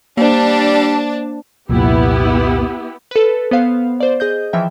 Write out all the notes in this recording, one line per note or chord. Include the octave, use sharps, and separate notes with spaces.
G3 A#3 D4 C5 A5
C2 F2 A#2 B3 E4 G4
A4 B4
B3 C5 F5
C5 D5
G#4 D#5 G6
E3 F3 E5 G5